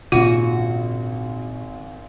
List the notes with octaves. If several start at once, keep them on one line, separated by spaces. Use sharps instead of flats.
G#1 A#2 C#3 D4 F4 F#4